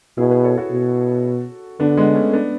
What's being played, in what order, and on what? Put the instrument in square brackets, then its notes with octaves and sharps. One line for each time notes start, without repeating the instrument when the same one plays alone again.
[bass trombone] B2 [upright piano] E4 G#4
[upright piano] G#4 B4
A4 C#5
F#4 A4
[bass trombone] B2
[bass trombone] D3 [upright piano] B3 D4
[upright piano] G#3 B3
A3 C#4
B3 D4